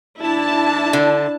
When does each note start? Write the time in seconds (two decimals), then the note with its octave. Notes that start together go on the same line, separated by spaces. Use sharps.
0.20 D#2 D4 E4 A5
0.93 D3